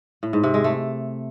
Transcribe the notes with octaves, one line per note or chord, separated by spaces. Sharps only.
A2
G#2
C3
G#3
A3